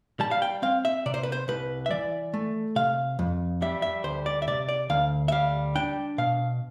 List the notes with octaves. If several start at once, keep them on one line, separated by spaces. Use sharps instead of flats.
G3 A5
F5
G5
C4 F5
E5
C3 D5
C5
B4
C5
C2 B4
E5
E3 D5
A3
C3 F5
F2
G3 E5
E5
D2 C5
D5
E5
C3 D5
D5
D2 F5
E5
G3 F5
D4 G5
B2 F5